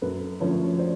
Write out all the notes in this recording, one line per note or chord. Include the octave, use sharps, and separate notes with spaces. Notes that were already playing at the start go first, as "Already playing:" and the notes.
F#2 A4 B4
D3 F3 A3 C#4 B4 C#5
C5 D5